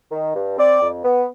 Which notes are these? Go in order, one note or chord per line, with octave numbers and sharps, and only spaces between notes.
D#3
G2
C4 D5
F2
B3